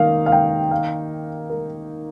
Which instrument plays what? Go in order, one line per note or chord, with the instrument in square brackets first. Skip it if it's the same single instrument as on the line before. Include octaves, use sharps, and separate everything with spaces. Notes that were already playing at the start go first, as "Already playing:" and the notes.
Already playing: [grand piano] D#3 A#3 D#4 [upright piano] F5
[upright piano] F5
G5
F5
A#4